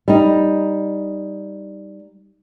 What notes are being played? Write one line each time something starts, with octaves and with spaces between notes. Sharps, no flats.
G3 D#4